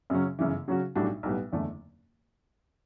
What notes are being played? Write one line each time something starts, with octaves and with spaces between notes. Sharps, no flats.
F#2 C#3 F#3 C#4
G1 F#2 C#3 E3
C#3 F#3 C#4 F#4
B1 A2 G3 D4 F#4
B1 A2 G3 B3
F#1 E2 D3 A3